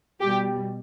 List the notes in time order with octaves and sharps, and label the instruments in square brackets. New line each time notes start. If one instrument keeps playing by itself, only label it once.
[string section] B2 G3 G4